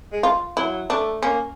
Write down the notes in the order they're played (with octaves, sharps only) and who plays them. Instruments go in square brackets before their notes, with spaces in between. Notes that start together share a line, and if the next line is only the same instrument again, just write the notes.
[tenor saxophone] G#3
[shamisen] F4
[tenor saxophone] F#3 [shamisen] E4
[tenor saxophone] A3 [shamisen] D4
[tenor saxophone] A#3 [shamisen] C#4